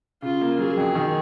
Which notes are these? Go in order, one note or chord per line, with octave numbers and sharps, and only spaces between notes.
C#3 F4
A#3
F#3 G#4
F2
D#3